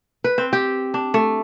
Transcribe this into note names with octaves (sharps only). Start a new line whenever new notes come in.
B4
C4
G4
D4
A3